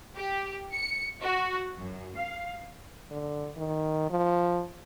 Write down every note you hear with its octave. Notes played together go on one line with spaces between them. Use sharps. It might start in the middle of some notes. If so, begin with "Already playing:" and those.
G4
C#7
F#4
F#2
F5
D3
D#3
F3